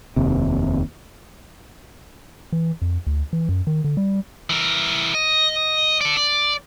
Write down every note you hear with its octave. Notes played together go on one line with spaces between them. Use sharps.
F1 D#2 C3
E3
F2
D2
E3
F#2
D#3
D3
G3
E3 A#4
D#5
A4 D5
D5